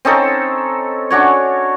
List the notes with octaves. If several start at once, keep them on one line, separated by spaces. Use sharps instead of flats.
C4 C#4 D#4 A4
C#4 D4 F#4 C#5